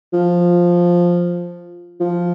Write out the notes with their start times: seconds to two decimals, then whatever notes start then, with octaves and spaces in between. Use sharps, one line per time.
0.13 F3
2.00 F3